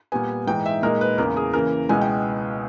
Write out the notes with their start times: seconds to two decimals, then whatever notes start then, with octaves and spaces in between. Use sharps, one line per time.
0.12 A#2 G3 B3 G#5
0.47 G#2 E3 G#3 D#4 G5
0.66 E5
0.83 A#2 G#3 D#4 A#4
1.01 B4
1.18 E2 C#3 E3 A#3 A#4
1.37 G#4
1.53 C#3 E3 A#3 A#4
1.89 C#2 B2 G#3 B3 E4 G#5
2.01 G5